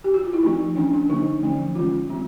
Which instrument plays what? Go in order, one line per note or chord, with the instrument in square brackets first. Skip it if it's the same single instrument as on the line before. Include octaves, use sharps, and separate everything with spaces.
[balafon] G4
F#4
F4
E4
F3 A3 C4 D#4
E3 A3 C#4 D4
D4
D3 F#3 A#3 D#4
D3 F3 A3 C#4
E3 G#3 C#4 F4
G3 C4